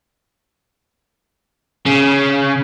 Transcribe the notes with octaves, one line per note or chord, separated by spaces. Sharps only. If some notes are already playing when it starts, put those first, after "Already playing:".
C#3